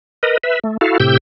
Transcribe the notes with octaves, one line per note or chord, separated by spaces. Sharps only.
A#4 B4 D#5
B4 E5
A3
E4 F#4 A4 F5
A2 C3 G4 E6 G6